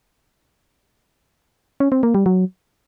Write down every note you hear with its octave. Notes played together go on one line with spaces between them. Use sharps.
C#4
C4
A#3
G3
F#3